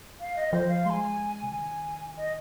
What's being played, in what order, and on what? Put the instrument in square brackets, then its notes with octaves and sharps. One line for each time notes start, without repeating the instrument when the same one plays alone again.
[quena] F5
D#5
[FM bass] F3 [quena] C5
[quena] F5
[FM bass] G#3 [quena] G#5 C6
[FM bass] C3
[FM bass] D#3 [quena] G#5
[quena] D#5